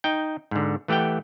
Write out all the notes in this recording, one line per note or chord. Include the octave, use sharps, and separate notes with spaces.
D#4 G5
G#2 D3
E3 A3 G4 F#5 G5